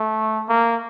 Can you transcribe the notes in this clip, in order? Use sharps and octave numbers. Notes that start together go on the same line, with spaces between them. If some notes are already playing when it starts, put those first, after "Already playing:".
Already playing: A3
A#3